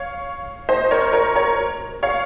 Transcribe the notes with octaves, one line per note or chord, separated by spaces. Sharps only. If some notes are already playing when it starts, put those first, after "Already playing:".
Already playing: C#5 F5
C5 D#5
A#4 C#5
A#4 C#5
A#4 C#5
C#5 F5